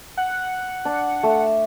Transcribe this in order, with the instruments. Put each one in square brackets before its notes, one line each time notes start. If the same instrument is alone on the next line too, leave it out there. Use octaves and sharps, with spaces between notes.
[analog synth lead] F#5
[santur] D4
A3